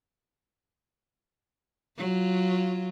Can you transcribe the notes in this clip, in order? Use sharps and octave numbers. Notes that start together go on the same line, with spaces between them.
F#3 F4